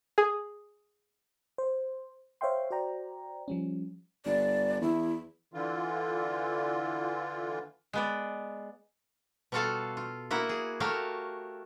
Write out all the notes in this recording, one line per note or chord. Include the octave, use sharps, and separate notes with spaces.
G#4
C5
C5 C#5 E5 F5 G5 C6
F#4 C5 D5 G5 A#5
F3 G3 C#4
G1 D5
E2 E4
D3 E3 F4
G#3 B3 D5
B2 G3 F4 F#4 A4 F5
F4
A#3 E4 F#4 F#5
G#4
A3 F#4 G4 A#4 C#5 F5